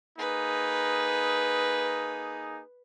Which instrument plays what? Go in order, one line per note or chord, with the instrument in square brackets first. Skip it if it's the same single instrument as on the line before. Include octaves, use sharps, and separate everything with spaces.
[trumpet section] A#3 D#4 G#4 [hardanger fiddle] B4